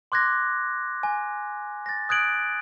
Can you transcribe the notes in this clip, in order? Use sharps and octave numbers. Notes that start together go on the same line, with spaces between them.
C6 D6 F#6 G#6 A#6
G#5
A6 A#6
D#6 F#6 G#6 D7 F#7